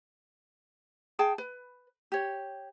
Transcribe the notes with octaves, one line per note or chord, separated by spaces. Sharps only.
G#4 G5 A5
B4
G4 C#5